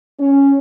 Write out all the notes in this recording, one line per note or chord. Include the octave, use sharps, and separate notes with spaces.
C#4